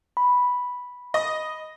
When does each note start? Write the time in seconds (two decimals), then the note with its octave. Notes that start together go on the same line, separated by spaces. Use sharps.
0.17 B5
1.14 D#5